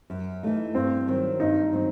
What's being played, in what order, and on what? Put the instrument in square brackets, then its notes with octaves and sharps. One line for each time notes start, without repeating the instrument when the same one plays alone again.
[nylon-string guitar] F#2
E3 A3 D#4
[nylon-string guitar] G2 [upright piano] C4
[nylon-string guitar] D#3 F#3 C4
[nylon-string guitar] G2 [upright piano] D#4
[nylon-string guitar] D#3 F#3 C4